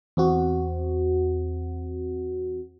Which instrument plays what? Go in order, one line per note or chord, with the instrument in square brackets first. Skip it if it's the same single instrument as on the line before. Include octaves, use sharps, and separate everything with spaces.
[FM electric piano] E2 C4 F#4